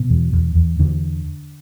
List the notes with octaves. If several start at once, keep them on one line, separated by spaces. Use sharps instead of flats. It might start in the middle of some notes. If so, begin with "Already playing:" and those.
Already playing: B2
E2
E2
E2
E2 D3